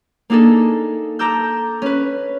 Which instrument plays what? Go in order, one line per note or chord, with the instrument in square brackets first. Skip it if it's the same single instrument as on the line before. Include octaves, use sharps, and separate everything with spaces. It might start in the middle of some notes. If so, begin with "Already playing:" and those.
[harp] A#3 D4 D#4 G#4 A4
A4 A#5 D6 E6 G6
C#4 B4